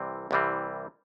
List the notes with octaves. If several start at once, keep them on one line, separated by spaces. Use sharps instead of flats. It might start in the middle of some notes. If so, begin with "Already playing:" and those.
Already playing: C2 C3 E3 G3 C4
C2 C3 E3 G3 C4